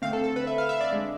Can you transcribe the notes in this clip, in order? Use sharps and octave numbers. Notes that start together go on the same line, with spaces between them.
D3 A3 C4 F5
A4
A4
B4
E5
F5
E5
D5
G#3 D4